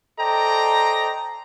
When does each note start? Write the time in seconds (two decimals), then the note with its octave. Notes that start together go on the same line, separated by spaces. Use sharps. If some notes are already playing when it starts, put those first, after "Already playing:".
0.20 A4 C5 D5 D#5 G5 A#5